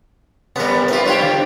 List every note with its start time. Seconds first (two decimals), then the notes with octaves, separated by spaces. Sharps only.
0.56 C3 G3 B3 A#4
0.88 C4 E4 F4 G4 B4
1.06 G3 D4 F4 G4 C5 C#5 G5
1.22 D3